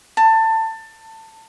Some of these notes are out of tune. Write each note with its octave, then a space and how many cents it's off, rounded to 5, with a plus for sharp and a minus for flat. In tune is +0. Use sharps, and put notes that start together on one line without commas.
A5 +20